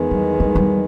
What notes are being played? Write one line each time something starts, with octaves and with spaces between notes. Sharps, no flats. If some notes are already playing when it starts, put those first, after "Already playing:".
Already playing: E2 D#3 G#3 B3
G3
G3
G3